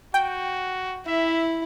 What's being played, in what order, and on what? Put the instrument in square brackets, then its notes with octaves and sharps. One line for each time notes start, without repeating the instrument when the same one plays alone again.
[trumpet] F#4 [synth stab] G5
[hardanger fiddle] E4 [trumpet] E5